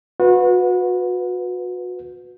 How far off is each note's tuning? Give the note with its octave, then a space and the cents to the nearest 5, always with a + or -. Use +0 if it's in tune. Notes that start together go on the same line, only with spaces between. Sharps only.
F#4 -30 B4 +0